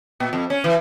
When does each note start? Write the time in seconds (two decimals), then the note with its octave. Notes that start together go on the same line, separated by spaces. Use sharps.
0.20 A#2
0.33 F2
0.50 C#4
0.64 E3